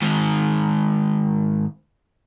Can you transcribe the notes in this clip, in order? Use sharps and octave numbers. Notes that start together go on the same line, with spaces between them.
G#2 D#3